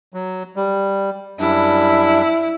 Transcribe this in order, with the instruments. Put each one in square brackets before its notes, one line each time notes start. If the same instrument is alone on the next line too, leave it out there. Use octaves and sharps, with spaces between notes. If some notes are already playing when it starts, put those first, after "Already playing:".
[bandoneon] F#3
G3
[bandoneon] F#2 G3 D4 [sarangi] E4